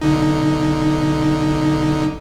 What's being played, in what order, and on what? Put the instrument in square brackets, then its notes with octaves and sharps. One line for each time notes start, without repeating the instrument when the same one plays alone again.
[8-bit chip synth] B1 D3 D#4